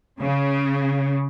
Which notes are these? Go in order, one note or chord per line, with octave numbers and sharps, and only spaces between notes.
C#3